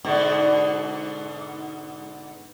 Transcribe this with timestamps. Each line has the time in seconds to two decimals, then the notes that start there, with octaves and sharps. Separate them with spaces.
0.05 G#2 B2 D3